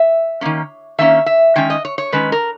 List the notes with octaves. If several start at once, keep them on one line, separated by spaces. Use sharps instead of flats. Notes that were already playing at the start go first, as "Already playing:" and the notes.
Already playing: E5
D#3 A#3 C#4
D#3 A#3 C#4 E5
E5
D#3 G#3 C#4 G5
D#5
C#5
C#5
D#3 G#3 C#4 B4
A#4